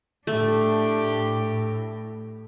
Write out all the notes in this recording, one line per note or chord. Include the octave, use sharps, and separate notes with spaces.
A2 A3 D4 G4